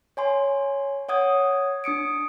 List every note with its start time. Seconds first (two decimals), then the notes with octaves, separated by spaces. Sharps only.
0.17 C#5 G#5 C6
1.09 C#5 F#5 D#6 G#6
1.84 D4 D#6 C#7 D7